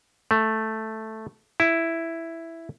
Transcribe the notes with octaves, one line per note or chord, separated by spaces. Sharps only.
A3
E4